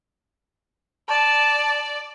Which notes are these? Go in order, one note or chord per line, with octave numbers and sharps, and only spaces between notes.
D5 A5